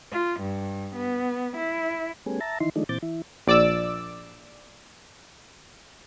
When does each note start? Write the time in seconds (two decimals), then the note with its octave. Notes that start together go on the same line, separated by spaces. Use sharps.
0.12 F4
0.41 G2
0.95 B3
1.56 E4
2.26 G3 A3 B3 C#4 G#4
2.41 E5 A5 A#5
2.60 D#3 E3 D#4 E4 C6
2.76 D#3 F3 G#3 A3 D4 D#4
2.89 A#2 E3 C4 D6 G6 A6
3.03 E3 E4
3.47 A#1 D5 D6 E6